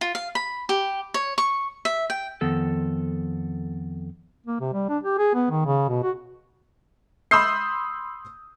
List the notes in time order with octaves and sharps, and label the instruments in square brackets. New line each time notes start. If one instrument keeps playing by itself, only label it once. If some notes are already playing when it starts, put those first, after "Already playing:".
[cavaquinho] F4
F5
B5
G4
C#5
C#6
E5
G5
[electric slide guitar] F2 D#3 B3 A4
[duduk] A#3
C3
G3
D4
G4
G#4
B3
D#3
C#3
B2
F#4
[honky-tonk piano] B5 C6 D#6 E6 G6 C7